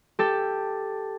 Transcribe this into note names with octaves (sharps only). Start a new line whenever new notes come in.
G4 A4